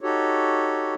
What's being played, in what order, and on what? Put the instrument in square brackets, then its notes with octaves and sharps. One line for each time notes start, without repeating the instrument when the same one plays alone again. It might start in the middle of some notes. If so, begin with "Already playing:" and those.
[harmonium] D#4 F#4 G4 A4 C#5